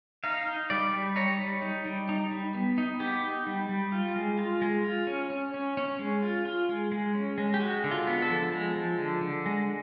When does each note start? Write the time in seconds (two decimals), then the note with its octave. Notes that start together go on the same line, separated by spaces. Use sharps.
0.24 D#4 F5
0.47 D#4
0.70 G3 D5
0.93 G3
1.16 D#4 C#5
1.39 G3
1.62 D#4
1.86 G3
2.09 D#4
2.31 G3
2.55 B3
2.78 D#4
3.00 B3 G4
3.24 D#4
3.47 G3
3.69 G3
3.92 F4
4.16 G#3
4.39 F4
4.62 G#3
4.84 F4
5.07 C#4
5.30 C#4
5.54 C#4
5.77 C#4
5.99 G#3
6.22 F4
6.45 F4
6.69 G#3
6.92 G#3
7.15 C#4
7.38 G#3
7.54 G4
7.60 G#3 F#4
7.84 D3
7.91 F4
8.07 B3
8.22 A4
8.30 F3
8.53 G#3
8.76 F3
8.98 D3
9.21 D3
9.46 G#3